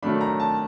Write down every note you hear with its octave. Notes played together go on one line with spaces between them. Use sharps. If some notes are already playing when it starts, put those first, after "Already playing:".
D#3 F#3 A3 D4 B5
A#5
A5